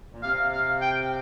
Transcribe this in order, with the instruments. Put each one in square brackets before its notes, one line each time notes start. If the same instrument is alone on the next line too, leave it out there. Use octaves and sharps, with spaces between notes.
[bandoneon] A#2
[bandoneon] C3 [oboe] F5
[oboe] F5
G5